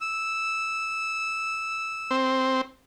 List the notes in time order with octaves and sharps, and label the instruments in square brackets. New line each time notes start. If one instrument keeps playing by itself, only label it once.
[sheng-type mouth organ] E6
[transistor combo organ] C4